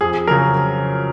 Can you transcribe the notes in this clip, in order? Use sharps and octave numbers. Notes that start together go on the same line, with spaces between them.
F2 G#4
C#3 F#3 A#4